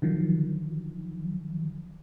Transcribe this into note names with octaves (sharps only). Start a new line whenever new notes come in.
D3 D#3 F3 F#3